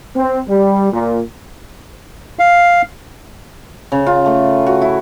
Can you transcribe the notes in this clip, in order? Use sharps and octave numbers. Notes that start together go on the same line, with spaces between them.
C4
G3
A#2
F5
C#3
F4
A3
F#4
E4